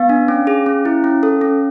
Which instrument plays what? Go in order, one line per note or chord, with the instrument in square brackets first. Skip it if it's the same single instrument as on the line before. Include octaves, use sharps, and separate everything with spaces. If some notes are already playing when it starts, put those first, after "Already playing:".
Already playing: [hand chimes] B3 F5
D4
C#4
G#4
C#4
E4
C#4
A4
C#4